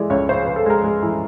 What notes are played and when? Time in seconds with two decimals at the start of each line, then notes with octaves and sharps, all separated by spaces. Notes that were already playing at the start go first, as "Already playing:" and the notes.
Already playing: E3 G#3 D5
0.10 C#2 C#5
0.29 C#3 C5
0.43 C#3 B4
0.56 A4
0.66 G#3 A#4
0.84 G#3
1.02 E3